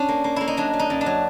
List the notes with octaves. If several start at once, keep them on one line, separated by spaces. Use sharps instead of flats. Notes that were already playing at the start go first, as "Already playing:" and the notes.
Already playing: C#4 D4
A#3
A#3
A#3 E4
D#4
F#3 D4
F#3
D#4
F#2
D4
F#3